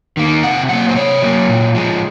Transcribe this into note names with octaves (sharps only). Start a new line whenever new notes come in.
D#3 A#3
C3 F#5
F#3 A#3 F#5
C5
C3 C#5
F#3 A#3
A#2
F3 G#3